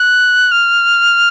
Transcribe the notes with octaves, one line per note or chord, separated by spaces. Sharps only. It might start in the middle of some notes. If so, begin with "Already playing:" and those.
Already playing: F#6
F6